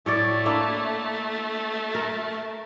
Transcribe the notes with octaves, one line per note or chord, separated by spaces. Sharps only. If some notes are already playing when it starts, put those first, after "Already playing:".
A2 A3 C#5 D5
A#3 D4 E4
A#4